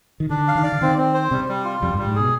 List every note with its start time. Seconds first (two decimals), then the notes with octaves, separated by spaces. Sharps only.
0.20 D#3
0.30 D3 D4
0.48 F5
0.55 D#3
0.63 D5
0.72 D3
0.81 D#3 C4
0.98 C4
1.14 C5
1.31 C3 G3
1.49 G3
1.65 F4
1.81 F2 G3
1.94 G2 G3
2.07 G#2
2.16 B2 G#4